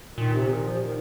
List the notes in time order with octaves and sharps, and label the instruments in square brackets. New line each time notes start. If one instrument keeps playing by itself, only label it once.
[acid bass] A#2 [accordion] D#3
[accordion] C3
D#3
F3
D#3